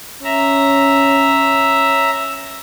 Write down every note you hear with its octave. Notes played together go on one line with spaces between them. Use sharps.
C#4 E5 A#5